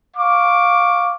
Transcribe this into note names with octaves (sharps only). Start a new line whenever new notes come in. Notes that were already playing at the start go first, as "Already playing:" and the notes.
F5 C#6 D6